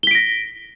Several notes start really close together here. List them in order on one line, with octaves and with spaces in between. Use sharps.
G7 B6 D7 A#6